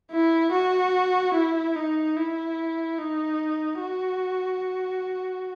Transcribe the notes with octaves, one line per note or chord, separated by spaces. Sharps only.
E4
F#4
E4
D#4
E4
D#4
F#4